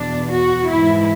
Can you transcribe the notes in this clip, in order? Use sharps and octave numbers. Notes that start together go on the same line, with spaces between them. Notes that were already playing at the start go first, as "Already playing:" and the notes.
Already playing: E2 B2 D4
F#4
G#2 E3 E4